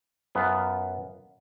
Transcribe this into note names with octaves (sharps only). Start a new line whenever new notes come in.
F#2 B3 F4